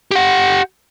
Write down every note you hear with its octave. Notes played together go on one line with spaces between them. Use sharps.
G4 F#5